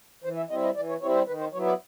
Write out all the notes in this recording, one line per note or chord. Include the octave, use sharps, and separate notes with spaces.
E3 C5
E5
G3 C4 E4 D#5
D#5
E3 D5
C#5
G3 C4 E4 C#5
C5
D#3 B4
C5
F#3 B3 E4 C#5
D5